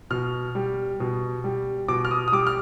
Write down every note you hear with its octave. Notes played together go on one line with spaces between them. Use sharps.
B2 F6
G3
B2
G3
B2 D6
F6
D#6
D#6
G3 D6
F6